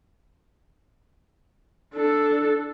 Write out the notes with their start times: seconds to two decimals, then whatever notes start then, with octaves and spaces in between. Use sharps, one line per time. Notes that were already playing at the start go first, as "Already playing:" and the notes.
1.94 D4 A4